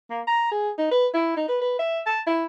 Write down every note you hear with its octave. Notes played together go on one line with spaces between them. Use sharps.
A#3
A#5
G#4
D#4
B4
E4
D#4
B4
B4
E5
A5
E4